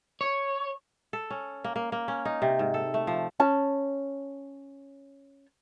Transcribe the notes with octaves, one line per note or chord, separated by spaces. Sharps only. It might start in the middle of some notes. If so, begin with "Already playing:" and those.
C#5
A4
C#4
A#3
A#3
A#3
C#4
D#4
C3
G#2
A4
A3
F3
C#4 A5